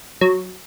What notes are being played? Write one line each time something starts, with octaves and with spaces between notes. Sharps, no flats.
F#3